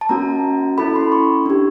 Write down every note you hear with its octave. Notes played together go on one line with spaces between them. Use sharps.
A5
A#3 C#4 F#4 A#5
C#4 E4 A4 B5
C6
C#6
D4 G4